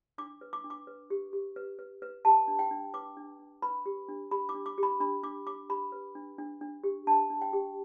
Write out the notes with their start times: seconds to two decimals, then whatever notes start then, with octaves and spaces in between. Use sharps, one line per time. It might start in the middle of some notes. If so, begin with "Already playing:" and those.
0.18 D4 D6
0.41 B4
0.53 D6
0.64 D4
0.70 D6
0.87 B4
1.10 G4
1.33 G4
1.56 B4
1.79 B4
2.02 B4
2.25 G4 A5
2.48 D4
2.59 G5
2.71 D4
2.94 B4 D6
3.17 D4
3.39 D4
3.62 B4 B5
3.86 G4
4.09 D4
4.31 G4 B5
4.49 D6
4.54 D4
4.66 D6
4.78 G4
4.83 B5
5.00 D4 B5
5.23 D4 D6
5.46 G4 D6
5.69 G4 B5
5.92 B4
6.15 D4
6.38 D4
6.61 D4
6.84 G4
7.07 D4 A5
7.30 D4
7.42 G5
7.53 G4